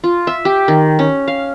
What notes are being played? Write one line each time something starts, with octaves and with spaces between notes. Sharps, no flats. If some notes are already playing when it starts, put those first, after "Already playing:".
F4
E5
G4
D#3
C#4
F5